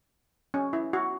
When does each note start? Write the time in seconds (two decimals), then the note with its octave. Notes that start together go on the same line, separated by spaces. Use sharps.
0.54 C#4
0.73 E4
0.93 F#4